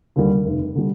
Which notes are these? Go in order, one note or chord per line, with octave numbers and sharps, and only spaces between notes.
D#2 D3 G3
F1
D3 G3